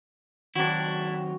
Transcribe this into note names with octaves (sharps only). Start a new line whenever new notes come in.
D#3 F#3 C4 D4 E4 F#4 A#5